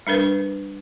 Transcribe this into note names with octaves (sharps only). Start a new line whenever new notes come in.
G3 D4 A#4 B4